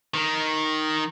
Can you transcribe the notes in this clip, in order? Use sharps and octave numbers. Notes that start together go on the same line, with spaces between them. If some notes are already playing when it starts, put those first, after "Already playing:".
D#3